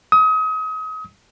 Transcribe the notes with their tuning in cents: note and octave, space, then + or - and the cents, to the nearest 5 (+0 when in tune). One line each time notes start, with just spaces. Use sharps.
D#6 +35